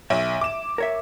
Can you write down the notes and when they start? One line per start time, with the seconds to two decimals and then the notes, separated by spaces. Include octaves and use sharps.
0.10 B1 E5
0.41 D6 E7
0.78 A#4 C#5 E5